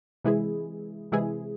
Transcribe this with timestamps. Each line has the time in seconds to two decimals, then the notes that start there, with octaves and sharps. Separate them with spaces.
0.24 C3 E3 G#3 E4 G#4
1.12 C3 E3 G#3 E4 G#4